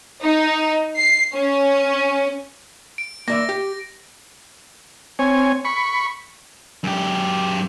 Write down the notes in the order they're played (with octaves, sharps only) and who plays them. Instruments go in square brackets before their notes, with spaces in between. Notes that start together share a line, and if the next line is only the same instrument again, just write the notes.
[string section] D#4
C7
C#4
[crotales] D7
[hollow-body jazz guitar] A#3 D5 E5 [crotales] A#6
[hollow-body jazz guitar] G4
[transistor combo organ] C4 C#5 G#5
B5 C#6
[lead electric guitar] F#2 G4